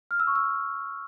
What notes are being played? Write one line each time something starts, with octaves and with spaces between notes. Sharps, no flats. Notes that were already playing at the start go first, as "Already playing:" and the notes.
F6
E6
C#6
E6